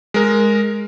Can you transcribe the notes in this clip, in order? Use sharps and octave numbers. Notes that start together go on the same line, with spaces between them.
G#3 A#4